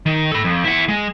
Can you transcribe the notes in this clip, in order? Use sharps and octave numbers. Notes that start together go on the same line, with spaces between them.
D#3
A4 B5
F2
E4 F#5
G#3